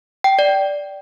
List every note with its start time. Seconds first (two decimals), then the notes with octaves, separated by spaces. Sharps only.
0.24 G5
0.39 D5